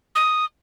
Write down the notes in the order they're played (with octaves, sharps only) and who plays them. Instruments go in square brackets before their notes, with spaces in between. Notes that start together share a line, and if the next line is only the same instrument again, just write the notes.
[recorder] D#6